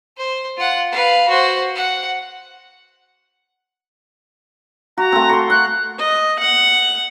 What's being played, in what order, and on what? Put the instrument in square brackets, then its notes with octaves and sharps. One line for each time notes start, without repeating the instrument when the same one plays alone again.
[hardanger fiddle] C5
F4 F#5
B4 F5
F#4 C5
F#5
[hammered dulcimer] F#4 [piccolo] A#5
[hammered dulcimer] A3 C4
C6 C#6
[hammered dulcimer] F#5 [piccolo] F#6
[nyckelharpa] D#5
F#5